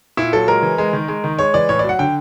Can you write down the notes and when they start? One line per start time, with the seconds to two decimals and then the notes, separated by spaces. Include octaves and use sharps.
0.17 A#2 E4
0.33 F#3 A4
0.48 G#3 A#4
0.63 E3
0.78 G#3
0.93 D#3
1.08 G#3
1.24 D#3
1.39 G#3 C#5
1.54 E3 D5
1.69 A2 C#5
1.79 D5
1.84 F#3
1.89 F#5
1.99 D3 G5